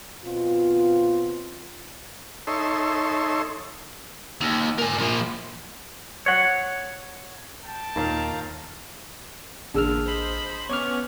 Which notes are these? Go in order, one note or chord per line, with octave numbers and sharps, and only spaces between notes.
B2 C4 F4
D#4 A4 C#5 E5 C6
D#2
A#4 G#5
A#2 F3
C#5 F#5
G5 A5
D#2 A#2 D#3 F5 A#5
A1 A#2 D3 D4 G#4 E6 F6
C5 D#5 B5
B3 C#4 C#5 C#6 D6 F6